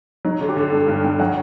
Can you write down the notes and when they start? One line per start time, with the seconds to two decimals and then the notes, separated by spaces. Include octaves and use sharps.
0.25 F#3 D#4
0.41 D3
0.49 G4
0.57 D3
0.72 G2 A4
0.88 G2 G5
1.04 G2 G5
1.20 F#3 F#5